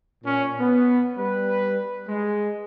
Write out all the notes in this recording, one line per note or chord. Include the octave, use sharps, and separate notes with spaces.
A#2 C#4
B3
G3 B4
G#3